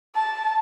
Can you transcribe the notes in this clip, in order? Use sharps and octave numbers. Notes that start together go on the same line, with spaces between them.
A5